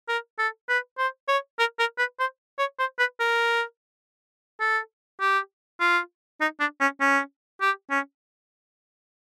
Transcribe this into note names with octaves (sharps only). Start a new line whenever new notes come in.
A#4
A4
B4
C5
C#5
A#4
A#4
B4
C5
C#5
C5
B4
A#4
A4
G4
F4
D#4
D4
C#4
C#4
G4
C#4